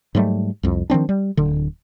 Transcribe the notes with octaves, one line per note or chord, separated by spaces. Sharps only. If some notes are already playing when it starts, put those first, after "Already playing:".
G#2 F#3 G3 A3
C2 F2
D#3 F3 C4 D4
G3
D1 D3